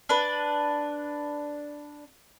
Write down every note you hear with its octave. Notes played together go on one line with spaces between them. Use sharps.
D4 B4